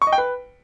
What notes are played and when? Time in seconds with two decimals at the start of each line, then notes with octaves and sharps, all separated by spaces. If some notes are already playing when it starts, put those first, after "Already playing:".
0.02 C#6
0.07 D#5
0.12 G5
0.18 B4